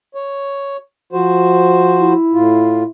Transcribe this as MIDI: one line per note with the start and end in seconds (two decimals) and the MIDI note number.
0.15 0.77 73
1.13 2.13 53
1.13 2.13 66
1.13 2.13 72
2.00 2.86 64
2.33 2.83 45
2.33 2.83 65